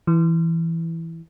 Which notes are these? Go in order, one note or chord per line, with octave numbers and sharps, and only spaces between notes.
E3